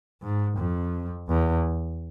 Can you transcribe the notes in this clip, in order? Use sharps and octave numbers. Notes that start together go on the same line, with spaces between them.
G#2
F2
E2